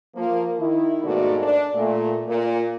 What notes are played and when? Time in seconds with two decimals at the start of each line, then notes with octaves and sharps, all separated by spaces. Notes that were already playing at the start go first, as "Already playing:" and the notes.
0.15 F3 A#3
0.59 D#3 E4
1.04 G#2 B2 A3 A#3 F#4 D5
1.43 D4
1.75 A#2 A3
2.28 A#2